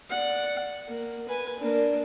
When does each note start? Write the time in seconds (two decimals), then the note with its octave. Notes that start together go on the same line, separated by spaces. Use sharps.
0.10 D5 F#5
0.88 A#3
1.28 B4 G#5
1.59 A#3 D4